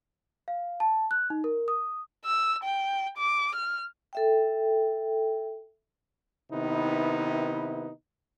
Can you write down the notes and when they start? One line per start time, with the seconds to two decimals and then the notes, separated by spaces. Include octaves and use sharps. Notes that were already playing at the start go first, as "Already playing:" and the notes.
0.48 F5
0.80 A5
1.11 F#6
1.30 D#4
1.44 A#4
1.68 D#6
2.26 E6
2.64 G5
3.18 D6
3.55 F6
4.13 A4 E5 G5
6.52 C3 D#3 B3 D#4 E4 B4